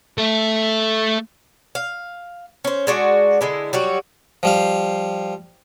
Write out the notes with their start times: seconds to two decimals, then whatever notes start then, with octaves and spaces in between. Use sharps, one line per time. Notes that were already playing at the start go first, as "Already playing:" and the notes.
0.18 A3 A4
1.75 F5
2.64 C#4 C5
2.87 G#3 D4 F#4
3.41 D3 G#3 E4
3.73 F#3 G3 F#4
4.43 F3 G3 F5